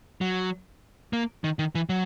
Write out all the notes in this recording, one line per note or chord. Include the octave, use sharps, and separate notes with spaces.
F#3
A#3
D#3
D#3
E3
F#3